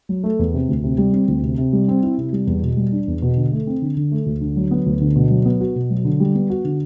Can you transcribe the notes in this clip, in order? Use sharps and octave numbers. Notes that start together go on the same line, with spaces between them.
F#3
A3
E2
C3
D2
C3
G3
C4
D2
C3
C3
G3
C4
E4
C3
G3
E2
B2
G3
D4
E2
B2
D3
A3
C4
D3
D3
A3
D2
D3
F#3
B3
D2
D3
B2
F#3
B3
F#4
B2
F#3
D3
G3
B3
F#4
D3